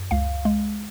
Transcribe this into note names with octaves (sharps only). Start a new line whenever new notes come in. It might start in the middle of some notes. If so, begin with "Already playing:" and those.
Already playing: F#2
C#2 F5
G#3